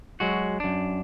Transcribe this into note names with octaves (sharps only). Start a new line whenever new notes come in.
F#3 G#3 F#4
F#2 D4